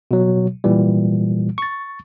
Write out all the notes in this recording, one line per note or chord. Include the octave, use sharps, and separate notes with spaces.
B2 F#3
A#2 E3 G3
C#6 A6